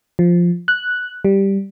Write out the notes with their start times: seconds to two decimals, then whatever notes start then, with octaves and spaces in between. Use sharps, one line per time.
0.19 F3
0.68 F#6
1.25 G3